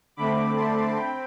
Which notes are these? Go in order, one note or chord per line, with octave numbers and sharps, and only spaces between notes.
D3 A3 C4 B5 D6
A5 C6
C4 G5 B5